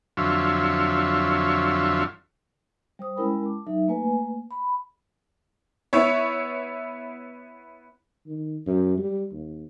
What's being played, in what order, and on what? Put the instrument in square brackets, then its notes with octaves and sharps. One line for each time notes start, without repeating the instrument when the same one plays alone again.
[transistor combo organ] F2 D3 F#3 F4 C#5 E5
[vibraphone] G3 C5 D#6
G#3 C#4 E4 A#4 G5 B5
A5 D6
F#3 D#4 A4 E5
A3 A#3 B4 G#5
B5
[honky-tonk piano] B3 E4 C#5
[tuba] D#3
F#2
G3
D#2